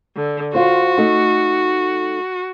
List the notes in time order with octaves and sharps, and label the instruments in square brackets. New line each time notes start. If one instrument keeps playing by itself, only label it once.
[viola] D3
[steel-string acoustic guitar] F4 C5 [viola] F#4
[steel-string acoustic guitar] A3 D#4